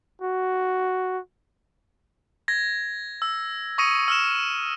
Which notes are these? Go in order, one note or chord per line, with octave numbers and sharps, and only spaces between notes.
F#4
G#6 A#6
E6
C#6 D#6 A#6 C#7 D#7
E6 F6 E7